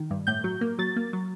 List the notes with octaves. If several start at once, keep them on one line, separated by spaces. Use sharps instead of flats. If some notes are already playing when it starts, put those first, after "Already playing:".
Already playing: D#3
G2
A2 G6
F#3
A#3
F#3 A6
A#3
F#3